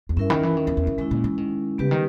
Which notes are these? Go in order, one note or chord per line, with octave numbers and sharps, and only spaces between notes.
E2
G2 C#4 E4 A#4 E5
D#3
E3
D#3
E2
E2
D#3
D#3 G#3 C#4 E4
A#2
E3
D#3
C#3 G3 B3 G4 B4
D#3